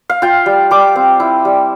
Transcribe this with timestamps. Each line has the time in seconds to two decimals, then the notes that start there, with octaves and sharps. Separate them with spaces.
0.10 F5
0.22 F4 G5
0.46 G3
0.71 G3 D6
0.96 C4
1.20 E4
1.45 G3